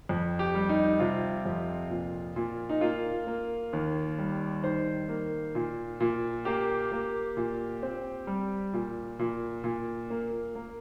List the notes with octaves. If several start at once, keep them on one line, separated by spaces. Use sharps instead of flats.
F2
G4
G3
D#4
C3 F4
F2
A#2
A#2
D#4
A#3 F4
A#3
D#2
G3
D#3 C5
A#3
A#2
A#2
A#3 G4
A#3
A#2
C4
G3
A#2
A#2
A#2
A#3
A#3